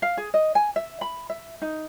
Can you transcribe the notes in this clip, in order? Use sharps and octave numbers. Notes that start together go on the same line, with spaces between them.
F5
G#4
D#5
G#5
E5
B5
E5
D#4